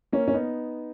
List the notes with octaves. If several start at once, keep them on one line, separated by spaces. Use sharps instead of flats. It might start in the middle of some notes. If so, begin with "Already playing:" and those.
A#3 C#4
C#4
B3 D#4